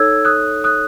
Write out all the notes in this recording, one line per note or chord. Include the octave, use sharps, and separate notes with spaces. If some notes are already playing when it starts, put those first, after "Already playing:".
Already playing: D#4 A4 C#5 E6 G#6
D#6 F#6
D#6 F#6